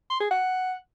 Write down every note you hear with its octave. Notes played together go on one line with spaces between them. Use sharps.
C6
G#4
F#5